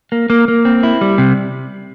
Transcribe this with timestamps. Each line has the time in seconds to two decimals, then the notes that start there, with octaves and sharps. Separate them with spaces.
0.12 A#3
0.30 A#3
0.48 A#3
0.65 C4
0.83 E4
1.01 G3
1.18 C3